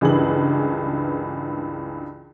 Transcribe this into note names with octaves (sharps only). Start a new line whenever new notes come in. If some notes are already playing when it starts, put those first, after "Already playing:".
C#2 G2 E3 G#4 A#4 F#7